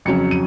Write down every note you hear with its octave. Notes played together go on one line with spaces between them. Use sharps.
F2 C#3 F#3 C#4 C#7
D#7